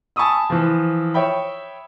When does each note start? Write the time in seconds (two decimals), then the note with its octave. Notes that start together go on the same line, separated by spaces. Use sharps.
0.16 G#5 A5 B5 C#6 D#6 E6
0.50 E3 F3
1.14 C#5 E5 G5 B5